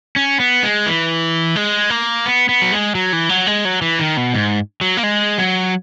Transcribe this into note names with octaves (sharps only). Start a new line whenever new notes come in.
C#4
B3
G#3
E3
G#3
A#3
B3
B3
F#3
G#3
F#3
E3
F#3
G#3
F#3
E3
D#3
B2
G#2
F#3
A#3
G#3
F#3